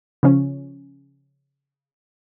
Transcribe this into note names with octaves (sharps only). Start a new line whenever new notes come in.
C#3 F3 C#4